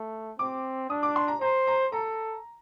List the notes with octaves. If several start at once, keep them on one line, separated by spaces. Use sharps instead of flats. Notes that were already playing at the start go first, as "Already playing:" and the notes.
Already playing: A3
C4 D6
D4 D#6
D6
C6
A#5
C5 A#5
A#5
A4 A#5